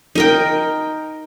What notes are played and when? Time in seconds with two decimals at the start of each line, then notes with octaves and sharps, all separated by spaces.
0.15 D#4 A#4 G5